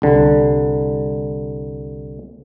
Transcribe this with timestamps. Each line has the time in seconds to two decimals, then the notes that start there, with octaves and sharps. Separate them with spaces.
0.02 C2 D3